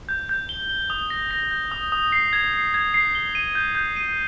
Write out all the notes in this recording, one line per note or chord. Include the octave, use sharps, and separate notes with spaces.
G6
G6
G7
G7
D#6
A#6
A#6
G6
D#6
D#6
C7
G#6
C7
G#6
C7
G7
D#7
G6
G6
D#7